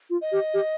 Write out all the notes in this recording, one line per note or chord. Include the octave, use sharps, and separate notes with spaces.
F4
D#5
G4
G4